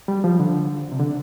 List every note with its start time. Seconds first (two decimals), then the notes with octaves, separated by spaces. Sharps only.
0.08 G3
0.24 F3
0.40 D3
0.92 C3
0.99 D3